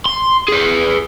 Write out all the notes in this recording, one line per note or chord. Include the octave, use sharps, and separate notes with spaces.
C6
G#4 B4